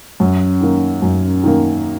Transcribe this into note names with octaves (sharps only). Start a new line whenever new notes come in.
F#2
D#3 A#3
F#2
D#3 A#3